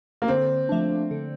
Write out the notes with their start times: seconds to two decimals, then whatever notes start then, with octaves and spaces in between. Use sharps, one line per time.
0.22 A#3
0.28 D3 C4
0.69 F3 A3 D4
1.11 D3